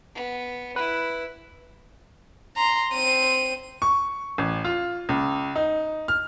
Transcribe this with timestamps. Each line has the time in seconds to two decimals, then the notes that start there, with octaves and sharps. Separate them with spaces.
0.15 B3
0.76 E4 B4
2.56 A#5 C6
2.93 C4 D#7
3.82 C#6
4.38 A1
4.64 F4
5.09 C#2
5.56 D#4
6.08 F6